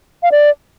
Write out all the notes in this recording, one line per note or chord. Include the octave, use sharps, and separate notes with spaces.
F5
D5